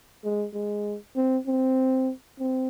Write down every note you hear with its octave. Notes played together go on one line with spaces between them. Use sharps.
G#3
G#3
C4
C4
C4